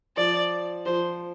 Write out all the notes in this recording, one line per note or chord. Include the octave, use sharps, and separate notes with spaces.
F3 D5
F3 C5